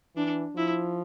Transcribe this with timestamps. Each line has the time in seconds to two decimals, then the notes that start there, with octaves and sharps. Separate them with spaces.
0.16 E3 D4
0.56 F3 E4